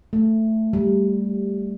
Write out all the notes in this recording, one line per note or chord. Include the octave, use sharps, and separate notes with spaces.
A3
G3